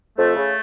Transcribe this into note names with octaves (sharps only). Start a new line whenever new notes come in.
F2 A3
C#3